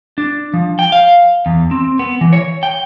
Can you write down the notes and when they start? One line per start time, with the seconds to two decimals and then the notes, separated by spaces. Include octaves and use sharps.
0.18 D4
0.54 F3
0.79 G5
0.92 F5
1.46 E2
1.71 C4
1.99 B3
2.21 E3
2.33 C#5
2.63 G5